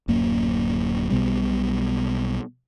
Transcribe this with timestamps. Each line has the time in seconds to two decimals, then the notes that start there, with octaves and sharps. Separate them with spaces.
0.08 D1 F#2 A#3
1.11 B1 B2 G3